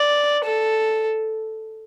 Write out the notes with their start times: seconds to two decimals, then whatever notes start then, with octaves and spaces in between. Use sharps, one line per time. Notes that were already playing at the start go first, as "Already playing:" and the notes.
Already playing: D5
0.44 A4